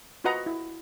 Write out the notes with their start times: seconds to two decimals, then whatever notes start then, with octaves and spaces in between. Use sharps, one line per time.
0.24 F4 F#4 B4 D#5 F#5 A#5
0.46 E4